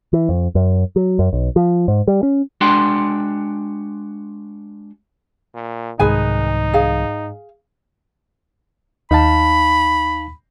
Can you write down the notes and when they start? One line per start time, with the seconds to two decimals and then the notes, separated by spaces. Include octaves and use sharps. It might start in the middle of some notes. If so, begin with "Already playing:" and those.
0.13 E3
0.29 F2
0.55 F#2
0.96 F#3
1.19 F#2
1.33 B1
1.56 F3
1.88 G#2
2.07 G3
2.23 C#4
2.61 G#3 D4 F#4 G5 C6
5.55 A#2
5.99 C2 G#2 D#3 D#4 G#4 B4 G#5
6.74 G#4 F5
9.11 D#2 D#4 F5 A5 B5